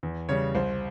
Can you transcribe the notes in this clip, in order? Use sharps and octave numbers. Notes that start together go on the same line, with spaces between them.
E2
C#3 G3 C#5
C2 C5